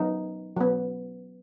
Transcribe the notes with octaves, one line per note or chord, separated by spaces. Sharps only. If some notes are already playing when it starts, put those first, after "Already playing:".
Already playing: F#3 B3 D#4
F#3 B3